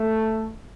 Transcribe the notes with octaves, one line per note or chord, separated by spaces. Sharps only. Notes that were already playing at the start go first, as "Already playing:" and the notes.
Already playing: A3